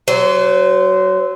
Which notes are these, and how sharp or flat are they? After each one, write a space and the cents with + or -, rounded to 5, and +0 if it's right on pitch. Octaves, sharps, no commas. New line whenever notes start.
F#3 +20 C5 -20